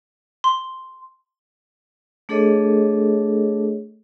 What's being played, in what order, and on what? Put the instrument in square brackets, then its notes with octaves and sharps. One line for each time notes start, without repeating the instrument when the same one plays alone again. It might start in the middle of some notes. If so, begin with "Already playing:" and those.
[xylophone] C6
[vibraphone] A3 D4 G#4 A4 C#5 D#5